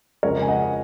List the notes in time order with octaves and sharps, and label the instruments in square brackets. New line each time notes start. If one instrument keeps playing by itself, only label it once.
[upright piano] F2 C#3 G#3 A#4 C#5
G#5
D#5 F#5